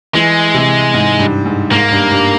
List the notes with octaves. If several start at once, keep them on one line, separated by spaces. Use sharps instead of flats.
E3 G#3
C3
G#2
G2
G#2
G#2 A#3
G2
G2